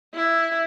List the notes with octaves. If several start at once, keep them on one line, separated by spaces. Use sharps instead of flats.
E4